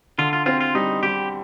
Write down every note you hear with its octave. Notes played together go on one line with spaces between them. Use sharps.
D3 F4
F4
C4 F4
F4
G3 D#4
G3 G4